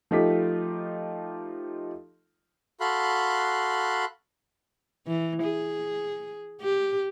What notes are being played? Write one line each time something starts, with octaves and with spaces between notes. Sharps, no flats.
F3 A3 D#4 F4 G4 B6
F#4 A4 F5 B5 C6 F#6
E3
G#4
G4